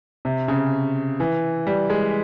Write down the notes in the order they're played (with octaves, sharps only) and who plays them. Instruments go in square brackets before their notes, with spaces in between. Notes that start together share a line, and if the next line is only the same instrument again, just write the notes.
[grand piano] C3
C#3
E3
G3
G#3